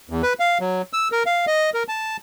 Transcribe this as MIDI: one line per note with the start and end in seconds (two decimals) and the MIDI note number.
0.10 0.22 40
0.23 0.33 71
0.40 0.58 77
0.60 0.82 54
0.93 1.08 88
1.12 1.23 70
1.26 1.45 77
1.47 1.70 75
1.74 1.83 70
1.88 2.17 81